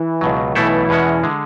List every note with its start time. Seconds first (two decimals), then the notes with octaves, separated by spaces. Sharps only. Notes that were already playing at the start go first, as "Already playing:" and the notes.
Already playing: E3
0.21 C#2 B2 F#3
0.55 B1 B2 E3 A3 E4 A4
0.89 E2 B2 G#3 C#4 F#4
1.23 D3 G#3